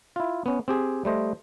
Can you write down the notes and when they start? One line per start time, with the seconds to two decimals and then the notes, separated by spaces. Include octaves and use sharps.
0.16 E4 F4
0.46 B3 C#4
0.68 C4 G4 G#4
1.05 G3 A3 C5 D#5